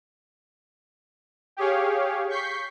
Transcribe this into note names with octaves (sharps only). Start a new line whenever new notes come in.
G4 G#4 C#5 F5
C#6 G6 B6 C7